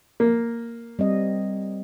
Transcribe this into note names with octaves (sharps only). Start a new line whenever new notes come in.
A#3
G3 C4 D#5